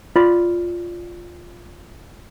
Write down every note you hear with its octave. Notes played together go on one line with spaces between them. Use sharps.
F4 D5 B5